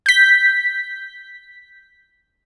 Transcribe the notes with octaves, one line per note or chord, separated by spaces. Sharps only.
G6 B6